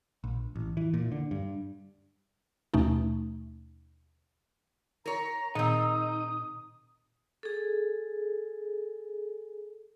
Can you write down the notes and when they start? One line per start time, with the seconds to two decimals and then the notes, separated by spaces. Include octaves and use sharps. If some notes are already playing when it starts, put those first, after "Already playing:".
0.24 A#1
0.55 A1
0.77 E3
0.94 A#2
1.12 D3
1.31 G2
2.74 D#2 B2 A3 C#4 D#4
5.06 A#4 C#5 A#5
5.55 A#2 D#3 C4 D#4 D#6
7.43 G#4 A4